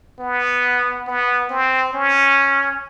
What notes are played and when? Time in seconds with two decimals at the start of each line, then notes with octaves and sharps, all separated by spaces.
0.20 B3
1.07 B3
1.50 C4
1.93 C#4